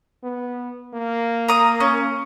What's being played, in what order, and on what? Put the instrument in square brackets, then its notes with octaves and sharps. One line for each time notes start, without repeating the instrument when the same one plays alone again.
[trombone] B3
A#3
[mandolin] A#5 D#6
C#4